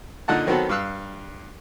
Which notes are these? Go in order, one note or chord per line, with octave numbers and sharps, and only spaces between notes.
A#2 D3 D#4 F#5 A5
D#3 F#3 B3 C4 F#4 A4
G2 F5 E6 F#6